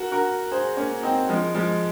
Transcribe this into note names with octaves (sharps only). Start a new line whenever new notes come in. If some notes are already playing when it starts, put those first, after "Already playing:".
Already playing: F#4 A#4
F#4 A#4
G#4 C5
A#3 C#4
C4 D#4
F3 G#3
F3 G#3